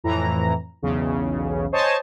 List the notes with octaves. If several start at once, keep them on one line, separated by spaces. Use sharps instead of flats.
F2 A2 E3 A#5
B1 E2 C#3
C5 C#5 D#5 G#5 A5